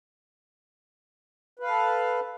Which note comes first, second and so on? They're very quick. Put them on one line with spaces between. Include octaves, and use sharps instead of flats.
B4 F5 A4